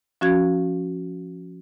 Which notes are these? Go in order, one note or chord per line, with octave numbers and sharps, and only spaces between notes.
F3 C#4 F#4 F5 G#6